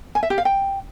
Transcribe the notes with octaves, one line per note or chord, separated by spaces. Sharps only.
G#5
E5
G4
F5
G5